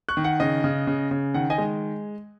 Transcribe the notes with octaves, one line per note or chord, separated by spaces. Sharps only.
C#6 F#6
D#3
F#5
C#3 D#5
C#3
C#3
C#3
D#3 F#5
D#5 G#5
G#3